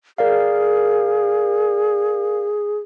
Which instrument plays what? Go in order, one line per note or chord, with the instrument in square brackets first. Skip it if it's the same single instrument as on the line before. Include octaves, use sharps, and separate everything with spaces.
[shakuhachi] G#4 [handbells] A#4 D5 F5